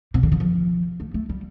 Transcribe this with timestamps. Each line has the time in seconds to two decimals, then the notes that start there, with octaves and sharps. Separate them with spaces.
0.14 C3
0.23 D3
0.32 D#3
0.40 F3
1.00 A3
1.14 A3
1.29 G3